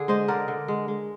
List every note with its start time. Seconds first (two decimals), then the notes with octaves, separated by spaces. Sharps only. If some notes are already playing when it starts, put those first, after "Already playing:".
Already playing: D3 G#4
0.08 G#3 C5 D#5
0.28 D3 A#4 D5
0.48 D3
0.68 G#3
0.88 G#3